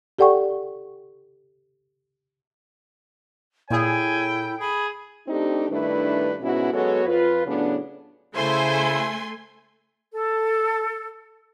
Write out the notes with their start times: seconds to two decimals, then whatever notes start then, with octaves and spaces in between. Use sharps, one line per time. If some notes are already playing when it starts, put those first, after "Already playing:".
0.19 G4 A4 D5 F#5 G5 C#6
3.70 A#2 E4 G#4 A4 C#5 G5 G#5
4.60 G#4 B5
5.28 A3 C4 D4 D#4 G4
5.70 G2 D#3 A3 D4 E4 B4
6.41 G#2 B2 B3 C#4 E4 F#4
6.73 F#3 G#3 B3 F#4 A4 C#5
7.06 F2 F4 B4
7.46 A2 C#3 F#3 B3 D4
8.35 C#3 A3 E4 C5 G#5 C6
10.12 A4